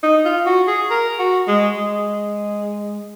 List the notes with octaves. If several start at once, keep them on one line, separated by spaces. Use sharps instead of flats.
D#4
F4
F#4
G#4
A#4
F#4
G#3
G#3